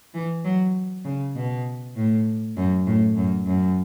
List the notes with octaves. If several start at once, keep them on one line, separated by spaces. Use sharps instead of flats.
E3
F#3
C#3
B2
A2
F#2
A2
F#2
F#2